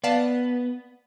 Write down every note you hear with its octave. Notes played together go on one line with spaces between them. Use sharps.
B3 D5 F5 A5